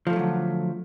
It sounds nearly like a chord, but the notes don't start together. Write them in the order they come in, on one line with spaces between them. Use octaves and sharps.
F3 A3 D#3 F#3 D3